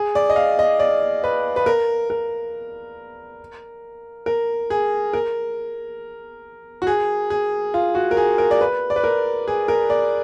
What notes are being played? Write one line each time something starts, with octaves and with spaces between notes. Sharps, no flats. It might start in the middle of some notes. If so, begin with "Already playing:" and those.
Already playing: G#4
D5
D#5
F5
D#5
D5
B4
B4
A#4
A#4
A#4
G#4
A#4
F#4
G#4
G#4
F4
F#4
A#4
G#4
A#4
D5
B4
D5
B4
A#4
G#4
A#4
D5